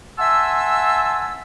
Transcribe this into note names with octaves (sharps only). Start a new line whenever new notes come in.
E5 F#5 G#5 A5 C6 E6